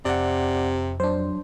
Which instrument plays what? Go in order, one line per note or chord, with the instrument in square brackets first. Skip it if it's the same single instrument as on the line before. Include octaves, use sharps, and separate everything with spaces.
[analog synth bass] F2 [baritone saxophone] C3 [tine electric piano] D5 F#5
[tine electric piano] F#3 [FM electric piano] D4 C5